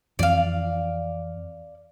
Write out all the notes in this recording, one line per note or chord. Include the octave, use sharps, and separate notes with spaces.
F2 E3 C4 D5 F5